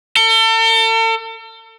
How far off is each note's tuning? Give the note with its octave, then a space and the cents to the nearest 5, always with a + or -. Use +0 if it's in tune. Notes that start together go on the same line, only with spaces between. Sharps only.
A4 +40